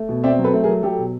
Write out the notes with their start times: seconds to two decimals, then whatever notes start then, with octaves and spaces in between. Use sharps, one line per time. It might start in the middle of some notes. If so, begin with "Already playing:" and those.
Already playing: A3
0.09 B2
0.24 C4 D5 E5
0.39 F#3
0.44 A4 B4
0.54 A3
0.64 G#4 A#4
0.68 F#3
0.83 F#3 G4 A4
0.98 B2